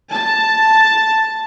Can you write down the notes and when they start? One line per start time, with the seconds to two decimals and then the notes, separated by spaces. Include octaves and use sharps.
0.12 A5